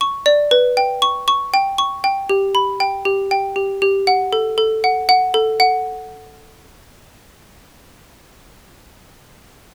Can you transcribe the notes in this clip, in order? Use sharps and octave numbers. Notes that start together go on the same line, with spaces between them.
C#6
D5
B4
G5
C#6
C#6
G5
C#6
G5
G4
B5
G5
G4
G5
G4
G4
F#5
A4
A4
F#5
F#5
A4
F#5